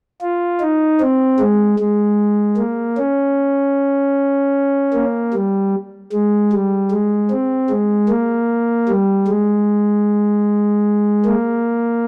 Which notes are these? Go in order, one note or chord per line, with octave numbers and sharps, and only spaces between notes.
F4
D#4
C4
G#3
G#3
A#3
C#4
A#3
G3
G#3
G3
G#3
C4
G#3
A#3
G3
G#3
A#3